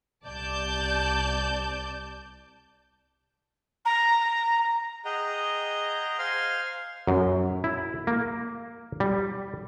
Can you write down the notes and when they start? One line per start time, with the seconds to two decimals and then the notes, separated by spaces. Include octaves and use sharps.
0.25 C2 D5 A5 G6
3.85 A#5
5.05 G#4 D#5 F#5 G5 A#5
6.18 C5 F5 G#5 C6 F6
7.07 F#2
7.64 E4
8.07 A#3
9.00 G3